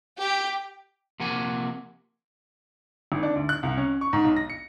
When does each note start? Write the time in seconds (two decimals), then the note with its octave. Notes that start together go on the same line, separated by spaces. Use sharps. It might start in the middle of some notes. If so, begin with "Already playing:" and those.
0.21 G4
1.20 C3 F3 A#3 F#5 G#5
3.12 G#1
3.23 D4
3.35 D2
3.49 F#6
3.63 C2
3.77 C#4
4.01 C#6
4.13 G#2
4.24 B1
4.36 A#6
4.50 C#7